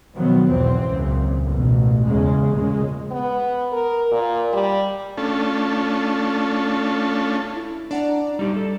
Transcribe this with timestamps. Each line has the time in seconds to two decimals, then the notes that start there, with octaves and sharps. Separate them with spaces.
0.16 B2 D#3 F3 F#3 B3
0.49 B1 E2 G#2 E3 C4
0.86 C#2 F#2 A#2
1.46 A1 B2
2.06 E2 C#3 G#3
2.52 A#1 A#2 C#3 G#3
3.11 B3
3.73 A#4
4.12 A#2
4.53 G3
5.17 A3 C#4 D4 F4 A4
7.55 E4
7.91 D4 D5 F#5 A#5
8.39 G3 D#4 G4 D5
8.56 A4